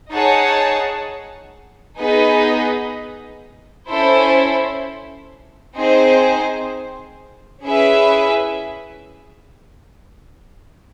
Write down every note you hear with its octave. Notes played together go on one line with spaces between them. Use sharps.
D#4 G#4 C#5 F#5 A5
B3 D#4 G#4 B4 D#5
C#4 E4 A4 C5
C4 D#4 G#4 C5
C#4 E4 G#4 B4 E5